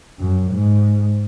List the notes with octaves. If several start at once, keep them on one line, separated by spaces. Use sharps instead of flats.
F#2
G#2